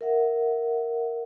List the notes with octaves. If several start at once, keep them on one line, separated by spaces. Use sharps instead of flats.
A#4 E5 F#5